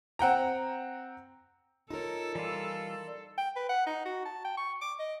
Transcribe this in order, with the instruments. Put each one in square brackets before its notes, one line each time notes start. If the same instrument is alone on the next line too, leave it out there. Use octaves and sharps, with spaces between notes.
[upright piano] C4 F#5 G5 A#5
[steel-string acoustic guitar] D#4 A#4 [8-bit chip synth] F4 C#5 [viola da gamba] A4
[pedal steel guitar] E3 G3 F4 [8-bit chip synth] D5
[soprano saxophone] G5
B4
F#5
D#4
F#4
A5
G5
C#6
D6
D#5